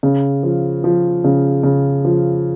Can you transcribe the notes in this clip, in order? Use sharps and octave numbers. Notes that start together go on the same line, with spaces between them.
C#3
F3
F3
C#3
C#3
F3